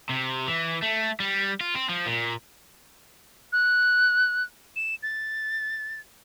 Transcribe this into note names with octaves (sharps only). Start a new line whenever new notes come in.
C3
E3
A3
G3
F4
C4
F3
A#2
F#6
E7
A6